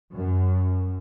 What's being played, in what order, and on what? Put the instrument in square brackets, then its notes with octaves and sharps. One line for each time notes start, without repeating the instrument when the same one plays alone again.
[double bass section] F#2